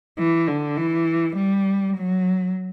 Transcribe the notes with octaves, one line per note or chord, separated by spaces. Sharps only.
E3
D3
E3
G3
F#3